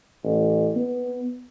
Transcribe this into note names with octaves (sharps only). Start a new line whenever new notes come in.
A1
B3